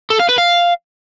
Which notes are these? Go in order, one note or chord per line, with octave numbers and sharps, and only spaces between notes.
A4
F5
B4
F5